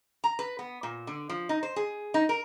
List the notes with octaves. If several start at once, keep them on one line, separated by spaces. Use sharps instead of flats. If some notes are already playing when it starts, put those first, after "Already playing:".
A#5
B4
B3
A#2
D3
F3
D#4
C5
G#4
D#4
A#4